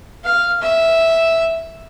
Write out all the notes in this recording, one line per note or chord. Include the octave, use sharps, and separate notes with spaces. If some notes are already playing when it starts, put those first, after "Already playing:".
F5
E5